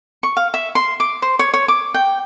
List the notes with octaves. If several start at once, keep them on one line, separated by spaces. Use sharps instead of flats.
C#6
F5
E5
C6
D6
C5
C#5
C#5
D6
G5